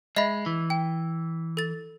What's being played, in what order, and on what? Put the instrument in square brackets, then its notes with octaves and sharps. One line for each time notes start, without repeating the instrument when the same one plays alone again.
[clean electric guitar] G#3 [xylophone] D#5 E5 B5
[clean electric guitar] E3
[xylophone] G5
A4 A6